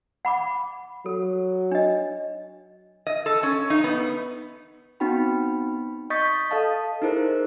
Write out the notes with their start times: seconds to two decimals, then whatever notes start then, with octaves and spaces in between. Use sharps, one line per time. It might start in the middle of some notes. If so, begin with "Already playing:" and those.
0.25 F#5 B5 D6
1.06 F#3 A4
1.71 D4 D#5
3.07 D#5
3.26 A4
3.43 C#4
3.70 D#4
3.84 B3
5.00 B3 C4 D#4 F#4 G5 B5
6.10 D#5 C#6 D#6 G6 A6 B6
6.51 A4 D#5 F5 A5
7.02 D#4 E4 G#4 A#4 C5